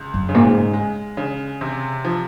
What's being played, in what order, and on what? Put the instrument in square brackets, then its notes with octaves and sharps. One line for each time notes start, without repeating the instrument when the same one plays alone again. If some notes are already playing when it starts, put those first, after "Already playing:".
Already playing: [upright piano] C#2
[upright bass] F#2
[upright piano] C#3
[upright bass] A#2
G#2
[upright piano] G#3
C#3
C3
F3